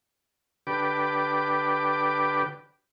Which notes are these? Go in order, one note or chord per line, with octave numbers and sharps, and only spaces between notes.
D3 G4 B4 D6